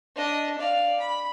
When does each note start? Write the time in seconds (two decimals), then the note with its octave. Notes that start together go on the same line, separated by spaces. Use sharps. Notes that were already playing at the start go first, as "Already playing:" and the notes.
0.16 D4 D#5
0.59 D5 F5
0.99 B5